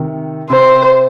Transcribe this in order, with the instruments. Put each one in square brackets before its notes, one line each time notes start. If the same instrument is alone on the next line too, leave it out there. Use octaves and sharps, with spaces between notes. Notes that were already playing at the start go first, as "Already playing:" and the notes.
Already playing: [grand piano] C3 D#3
[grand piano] C3 [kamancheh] C5